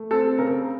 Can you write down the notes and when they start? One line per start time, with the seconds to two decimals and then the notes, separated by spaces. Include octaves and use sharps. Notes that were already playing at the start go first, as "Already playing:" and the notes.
Already playing: A3
0.11 C4 A4
0.38 C#3 A#4